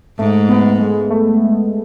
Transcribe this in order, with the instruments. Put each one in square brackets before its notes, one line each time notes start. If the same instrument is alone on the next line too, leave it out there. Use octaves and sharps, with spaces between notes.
[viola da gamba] G#2 [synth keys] A3
[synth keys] B3
G#3
A3